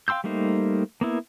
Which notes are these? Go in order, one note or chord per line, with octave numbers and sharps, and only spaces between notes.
F5 G5 C6 E6 G6
G3 A3 A#3 D#4 C5
A#3 B3 E4